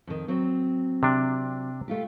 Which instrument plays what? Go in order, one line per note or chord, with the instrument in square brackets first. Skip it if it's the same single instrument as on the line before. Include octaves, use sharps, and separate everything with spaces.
[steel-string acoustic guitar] F2 D#3
F#3 C4
[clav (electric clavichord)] C3 D4
[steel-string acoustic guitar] A3 F4 G4